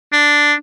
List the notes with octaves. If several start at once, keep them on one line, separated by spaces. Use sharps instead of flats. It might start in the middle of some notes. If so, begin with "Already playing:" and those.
D4